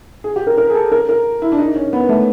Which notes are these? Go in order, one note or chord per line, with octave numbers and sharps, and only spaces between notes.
G#4
G4
A#4
A#4
G#4
A4
A#4
A#4
E4
D4
D#4
C#4
B3
A3